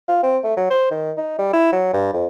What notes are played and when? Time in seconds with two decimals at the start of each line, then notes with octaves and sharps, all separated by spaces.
0.08 F4
0.23 C4
0.44 A3
0.57 F#3
0.70 C5
0.91 D#3
1.17 D#4
1.39 G3
1.53 E4
1.72 F#3
1.93 G2
2.13 F2